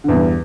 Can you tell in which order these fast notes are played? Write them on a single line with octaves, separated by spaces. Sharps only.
D3 E2 G2